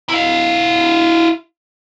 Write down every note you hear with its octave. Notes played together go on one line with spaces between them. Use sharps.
E4 F5